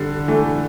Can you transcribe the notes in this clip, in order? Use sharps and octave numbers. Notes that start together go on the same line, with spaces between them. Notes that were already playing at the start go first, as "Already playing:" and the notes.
Already playing: D3 G3
E3 A3